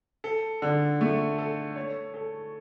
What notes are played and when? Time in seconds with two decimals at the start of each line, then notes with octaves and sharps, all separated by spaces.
0.24 A4
0.62 D3
1.01 A3
1.38 A4
1.76 C#5
2.14 A4